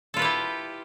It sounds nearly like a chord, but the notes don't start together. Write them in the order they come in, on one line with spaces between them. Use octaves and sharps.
A4 F4 B4 G4 E4